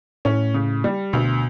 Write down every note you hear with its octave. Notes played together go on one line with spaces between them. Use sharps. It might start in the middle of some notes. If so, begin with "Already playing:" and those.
A2 C#4
C#3
G3
D2 B2